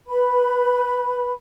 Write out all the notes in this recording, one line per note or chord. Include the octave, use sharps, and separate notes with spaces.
B4 B5